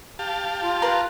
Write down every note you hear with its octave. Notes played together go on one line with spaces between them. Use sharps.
G4 F5 A5
F4
A#4 B4 C6